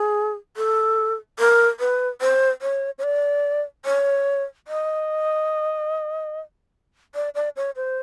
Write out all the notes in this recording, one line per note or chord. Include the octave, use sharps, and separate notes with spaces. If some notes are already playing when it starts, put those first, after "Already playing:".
Already playing: G#4
A4
A#4
B4
C5
C#5
C#5
D5
C#5
D#5
D5
D5
C#5
C5